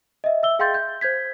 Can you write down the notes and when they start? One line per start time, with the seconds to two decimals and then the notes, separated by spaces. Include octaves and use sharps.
0.24 D#5 E5
0.43 E5 E6 G7
0.59 G#4 F5 G5 C6 G6 A6
0.74 G6
1.01 C5 G6 G#6 B6